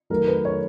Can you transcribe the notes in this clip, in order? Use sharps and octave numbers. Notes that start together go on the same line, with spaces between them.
D#3 F#3 A3 A#4
B4
C#5